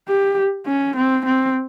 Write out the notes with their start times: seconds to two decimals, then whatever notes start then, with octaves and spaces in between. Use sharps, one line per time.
0.09 G4
0.67 C#4
0.96 C4
1.25 C4